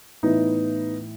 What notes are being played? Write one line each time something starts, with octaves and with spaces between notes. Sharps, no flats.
A2 E3 B3 D#4